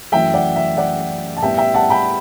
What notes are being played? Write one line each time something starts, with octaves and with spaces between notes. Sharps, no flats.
F#2 E3 A3 E5 G5
D5 F#5
E5
D5 F#5
A5
A2 G3 B3 E5 G5
E5 G5
F#5 A5
G5 B5